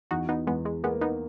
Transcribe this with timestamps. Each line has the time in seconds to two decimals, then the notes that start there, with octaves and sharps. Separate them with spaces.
0.11 E2 D#4 F#4
0.29 B3 D#4
0.47 E2 G#3 B3
0.65 G#3
0.84 G#3 A#3 B3
1.01 B3 D#4